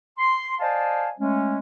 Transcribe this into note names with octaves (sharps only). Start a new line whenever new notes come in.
C6
C5 D5 D#5 F5 G#5 A5
G#3 A3 C#4